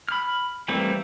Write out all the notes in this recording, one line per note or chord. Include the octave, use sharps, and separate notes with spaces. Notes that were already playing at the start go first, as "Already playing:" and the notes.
B5 F6
E3 G3 A3 A#3 C4